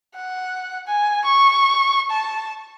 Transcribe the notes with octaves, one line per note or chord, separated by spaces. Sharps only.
F#5
G#5
C#6
A5